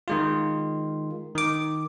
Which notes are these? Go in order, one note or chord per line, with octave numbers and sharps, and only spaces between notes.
D#3 G#3 F4
D#3 D6